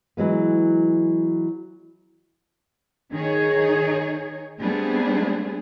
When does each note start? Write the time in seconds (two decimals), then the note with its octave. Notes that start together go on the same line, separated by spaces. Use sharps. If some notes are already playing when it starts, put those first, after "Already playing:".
0.17 E3 F#3 G#3 B3
3.12 D#3 D#4 G#4 C#5
4.59 G3 A3 B3 C4 D4 G#4